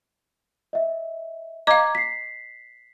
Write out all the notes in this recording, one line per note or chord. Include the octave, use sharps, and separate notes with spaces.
D#5 E5
D#5 F5 A#5 D6 G#6
B6 C7